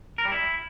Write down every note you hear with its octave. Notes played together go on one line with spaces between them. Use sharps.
A#4
G3
E4